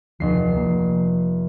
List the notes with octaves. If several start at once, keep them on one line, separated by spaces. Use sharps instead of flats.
F1 D2 D3 E3 C7
F3 A#3